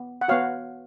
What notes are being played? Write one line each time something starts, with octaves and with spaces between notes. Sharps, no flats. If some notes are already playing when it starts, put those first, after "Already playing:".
Already playing: B3
F#5
B3 F#4 C#5 F5